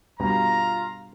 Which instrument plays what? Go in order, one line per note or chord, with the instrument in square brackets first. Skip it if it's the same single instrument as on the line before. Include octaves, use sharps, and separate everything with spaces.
[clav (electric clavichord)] G2 B2 [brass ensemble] F4 F5 A#5